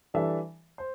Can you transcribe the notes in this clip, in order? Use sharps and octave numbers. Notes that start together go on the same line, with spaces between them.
E3 G3 D4 A4 E5
C5